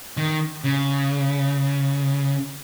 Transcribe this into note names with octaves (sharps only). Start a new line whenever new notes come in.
D#3
C#3